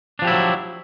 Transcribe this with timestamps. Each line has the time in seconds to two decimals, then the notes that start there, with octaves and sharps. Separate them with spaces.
0.19 D4
0.22 F3
0.25 G4
0.27 E4
0.30 F#3